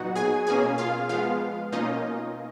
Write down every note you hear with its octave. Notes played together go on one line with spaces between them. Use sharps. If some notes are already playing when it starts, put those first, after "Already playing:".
Already playing: A#2 F#3 B3 D#4 F#4 F#5
G#4 G#5
B2 A#3 C#4 G#4 G#5
F4 F5
F3 G#3 B3 F4 F5
B2 A#3 C#4 D#4 F4 D#5